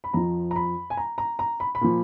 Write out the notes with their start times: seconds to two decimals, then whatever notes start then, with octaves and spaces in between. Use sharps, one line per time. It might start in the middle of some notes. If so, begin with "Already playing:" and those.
0.04 B5
0.14 F2 F3 A#5
0.51 A#5
0.56 B5
0.90 G#5
0.97 A#5
1.18 A#5
1.39 A#5
1.60 B5
1.75 B5
1.81 A#2 F3